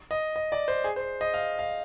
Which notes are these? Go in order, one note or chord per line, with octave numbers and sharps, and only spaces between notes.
D#5
D#5
D5
C5
G#4
C5
D#5
F5
F5